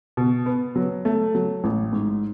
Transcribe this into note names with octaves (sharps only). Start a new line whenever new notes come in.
B2
B3
F#3
A3
F#3
A1
G#2